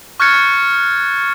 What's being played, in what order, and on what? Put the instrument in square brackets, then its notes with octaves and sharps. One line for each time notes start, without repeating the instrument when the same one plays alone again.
[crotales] C#6 F6 F#6 G#6 A6 C#7